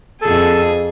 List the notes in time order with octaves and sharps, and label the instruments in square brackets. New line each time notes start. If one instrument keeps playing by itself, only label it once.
[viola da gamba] F2 G#4 [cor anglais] A4